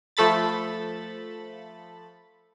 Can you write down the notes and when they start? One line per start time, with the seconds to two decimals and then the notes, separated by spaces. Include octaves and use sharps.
0.17 F3 A3 A4 B5 A6